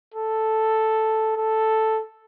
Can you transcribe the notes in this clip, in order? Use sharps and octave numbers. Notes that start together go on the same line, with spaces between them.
A4
A4